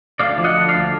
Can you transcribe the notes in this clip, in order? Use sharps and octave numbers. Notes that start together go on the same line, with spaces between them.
D2 D5 F5
F3
D#5 F#5
D3
D5 F5
D2